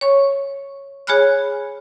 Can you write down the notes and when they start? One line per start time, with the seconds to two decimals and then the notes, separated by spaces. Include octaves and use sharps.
0.01 C#5 C#6
1.07 G#4 C#5 G#5 B5 F6 F#6